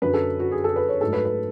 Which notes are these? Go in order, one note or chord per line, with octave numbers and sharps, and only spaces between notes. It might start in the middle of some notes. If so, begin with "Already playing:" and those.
F#2 D3 F#3 B4
A4
F#4
G#4
A4
B4
C#5
G#2 F#3 A3 A4
B4
B4